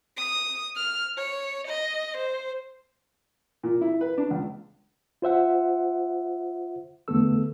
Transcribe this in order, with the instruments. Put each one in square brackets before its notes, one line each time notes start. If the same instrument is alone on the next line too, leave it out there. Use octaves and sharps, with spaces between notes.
[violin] D#6
F6
C#5
D#5
C5
[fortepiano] A#2
E4
B4
D4
C#2
[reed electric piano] F4 C5 E5 F#5
E2 D3 A3 B3 A4 E6